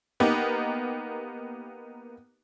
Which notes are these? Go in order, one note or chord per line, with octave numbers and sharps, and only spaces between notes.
A#3 B3 D#4 G4